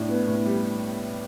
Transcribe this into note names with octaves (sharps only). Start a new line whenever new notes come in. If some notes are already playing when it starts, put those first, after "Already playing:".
Already playing: A2 D4
B3
A2
G3